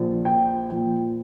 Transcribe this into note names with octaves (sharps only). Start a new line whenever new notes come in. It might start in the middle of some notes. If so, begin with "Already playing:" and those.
Already playing: A#1 A#2 F3
G5
A#2 F3 G5